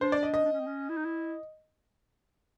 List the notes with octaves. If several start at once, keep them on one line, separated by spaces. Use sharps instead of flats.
D4 C5
D5
D#5
D#5
D4
C#4
C4
C#4
E4
D#4
E4